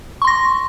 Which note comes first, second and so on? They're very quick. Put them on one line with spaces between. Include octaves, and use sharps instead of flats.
C#6 C6 A#6